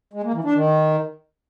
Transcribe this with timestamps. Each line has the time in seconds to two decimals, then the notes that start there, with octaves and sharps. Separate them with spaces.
0.13 G#3
0.24 A#3
0.34 E3
0.44 D4
0.54 D#3